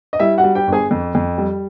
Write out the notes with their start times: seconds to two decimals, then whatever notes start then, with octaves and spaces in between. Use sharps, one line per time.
0.13 D#5
0.19 G3 E4 E5
0.38 F#4 F#5
0.44 G3
0.55 G4 G5
0.67 G1
0.73 G#4 G#5
0.91 F2
1.15 F2
1.38 G3